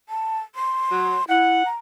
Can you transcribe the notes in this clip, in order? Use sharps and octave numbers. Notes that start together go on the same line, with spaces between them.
A5
C6
F#3
E4 F#5
A#5